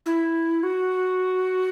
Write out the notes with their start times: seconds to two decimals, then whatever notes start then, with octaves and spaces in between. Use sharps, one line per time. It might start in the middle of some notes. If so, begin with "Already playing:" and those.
0.06 E4
0.63 F#4